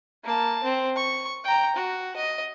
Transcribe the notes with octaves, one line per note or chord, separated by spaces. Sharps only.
A#3 A5
C4
C#6
G5 A#5
F#4
D#5